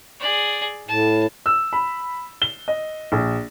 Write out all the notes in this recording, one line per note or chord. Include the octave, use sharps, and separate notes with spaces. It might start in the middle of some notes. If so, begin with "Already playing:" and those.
G#4 D5
A2 A5
E6
B5
G7
D#5
A#1